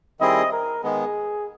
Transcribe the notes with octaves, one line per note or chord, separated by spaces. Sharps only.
D#3 G3 C4 E4 G#4 D#5
A#4
D#3 G#3 B3 G#4